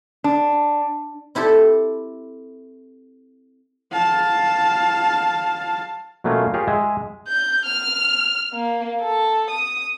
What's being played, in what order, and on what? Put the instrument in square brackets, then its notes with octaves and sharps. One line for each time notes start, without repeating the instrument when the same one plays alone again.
[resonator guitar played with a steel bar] D4
[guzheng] C4 E4 G4 A4
[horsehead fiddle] F5 A5
[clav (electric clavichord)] B2 F#3 A3 A#3 C#4 F4
F4 G4 G#4 A#4 C#5
G#3 G#4 E5 G#5
[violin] G6
F6
A#3
A4
D#6